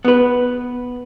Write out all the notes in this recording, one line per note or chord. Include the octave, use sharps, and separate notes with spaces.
B3 B4